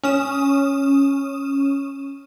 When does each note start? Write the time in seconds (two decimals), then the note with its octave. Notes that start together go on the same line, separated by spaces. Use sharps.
0.04 C#4 D#6 E7